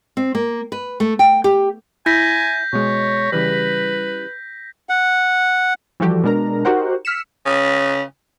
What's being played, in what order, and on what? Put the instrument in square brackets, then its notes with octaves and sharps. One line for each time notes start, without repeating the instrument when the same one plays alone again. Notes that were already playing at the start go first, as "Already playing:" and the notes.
[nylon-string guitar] C4
A#3
B4
A3
G5
G4
[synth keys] E4 [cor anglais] G#5 [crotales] G6 A#6 B6
[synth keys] B2 G#3 [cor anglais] C#5
[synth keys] C#3 E3 G3 [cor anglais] B4
[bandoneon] F#5
[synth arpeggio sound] E3 F3 G3 F#4 G4 A4
B2 G#3 D4 A#4 A#5
D#4 F#4 G4 A#4 C5 F#5
E6 F6 B6 C#7 E7
[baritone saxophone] C#3